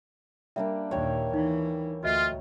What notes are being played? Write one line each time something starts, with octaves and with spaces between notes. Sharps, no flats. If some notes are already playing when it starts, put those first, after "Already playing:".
G3 A#3 D4 E5
D#2 A#2 C#5 G5
E3 D#4
D2 F4 F#4 D#5 E5